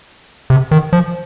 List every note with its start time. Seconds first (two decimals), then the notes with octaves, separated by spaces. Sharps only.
0.50 C3
0.71 D#3
0.93 F3